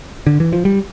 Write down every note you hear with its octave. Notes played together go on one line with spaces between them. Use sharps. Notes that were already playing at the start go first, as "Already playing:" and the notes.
D3
E3
F3
G3